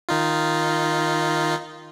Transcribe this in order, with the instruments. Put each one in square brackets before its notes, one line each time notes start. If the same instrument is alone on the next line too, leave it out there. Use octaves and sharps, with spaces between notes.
[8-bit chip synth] D#3 D#4 F4